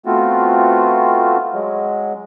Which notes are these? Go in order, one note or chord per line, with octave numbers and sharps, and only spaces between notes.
A3 B3 C4 F4 F#4
F#3 G#3